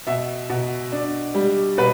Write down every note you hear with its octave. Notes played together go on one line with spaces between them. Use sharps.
B2 E5
B2
D4
G3
B2 B4